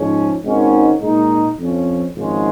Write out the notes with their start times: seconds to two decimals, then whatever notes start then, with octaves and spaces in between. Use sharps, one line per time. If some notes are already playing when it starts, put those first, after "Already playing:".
Already playing: G#2 F3 G#3 C#4
0.44 G#1 G#2 D#3 C#4
1.01 A#2 G#3 D#4
1.58 F2 F3 C#4
2.16 G#1 G#2 F3 G#3 C#4